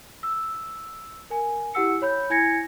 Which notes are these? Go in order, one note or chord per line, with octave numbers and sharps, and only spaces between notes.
E6
A#4 G#5
E4 G4 F#5 E6 C#7
C#5 B5 G6
E4 G#5 G#6 A#6 C#7